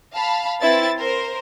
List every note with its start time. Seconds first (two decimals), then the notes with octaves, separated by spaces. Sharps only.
0.14 F5 A5 B5
0.61 C4 E4 B4 A6
0.99 A#4 C5